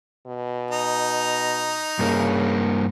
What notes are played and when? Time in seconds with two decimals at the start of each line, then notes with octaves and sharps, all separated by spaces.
0.27 B2
0.71 D#4 A#5
1.99 G2 C#3 A#3